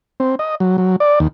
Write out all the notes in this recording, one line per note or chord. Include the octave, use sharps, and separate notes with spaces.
C4
D#5
F#3
F#3
D5
D#2